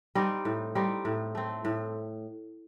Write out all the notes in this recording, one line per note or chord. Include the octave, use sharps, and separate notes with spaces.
G3 C4 D#4
A2
G3 C4 D#4
A2
A3 C4
A2